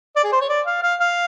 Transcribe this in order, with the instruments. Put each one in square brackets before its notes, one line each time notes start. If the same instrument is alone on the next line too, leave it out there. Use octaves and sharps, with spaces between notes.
[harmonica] D5
G#4
C5
C#5
D5
F5
F5
F5